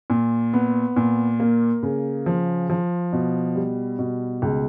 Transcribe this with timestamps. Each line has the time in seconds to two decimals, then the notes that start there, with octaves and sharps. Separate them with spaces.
0.10 A#2
0.53 B3
0.96 A#2
1.40 A#3
1.83 C#3
2.26 F3
2.70 F3
3.13 B2
3.55 G3
3.99 B2
4.42 C#2